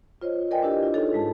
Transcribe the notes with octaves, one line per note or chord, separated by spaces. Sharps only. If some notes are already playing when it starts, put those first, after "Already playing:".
F4 C5 C#5 D#5
A#4 B4 D5 D#5 G5 G#5
D4 E4 G4 A#4 B4
F4
D#4 F4 G#4 A4 C#5
G#2 G#3 A5